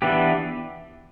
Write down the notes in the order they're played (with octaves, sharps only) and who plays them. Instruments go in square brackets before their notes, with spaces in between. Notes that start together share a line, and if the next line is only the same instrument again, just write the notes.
[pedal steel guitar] E3 B3 D4 G4 B4